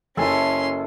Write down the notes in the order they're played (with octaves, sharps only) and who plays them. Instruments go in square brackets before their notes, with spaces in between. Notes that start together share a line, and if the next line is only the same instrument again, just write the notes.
[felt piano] F#1 G#5 [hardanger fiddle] C#4 C6 [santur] E4 A4